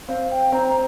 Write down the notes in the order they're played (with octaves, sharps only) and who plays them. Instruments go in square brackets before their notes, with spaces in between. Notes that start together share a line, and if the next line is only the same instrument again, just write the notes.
[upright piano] C4 [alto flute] F5
[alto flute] G5
[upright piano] C4 [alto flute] A#5
[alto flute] A#5